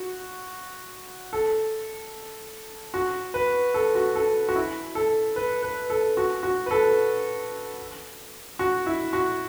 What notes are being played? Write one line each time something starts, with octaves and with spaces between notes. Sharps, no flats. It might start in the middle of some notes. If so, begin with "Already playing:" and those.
Already playing: F#4
A4
F#4
B4
A4
F#4
A4
F#4
E4
A4
B4
B4
A4
F#4
F#4
B4
A4
F#4
E4
F#4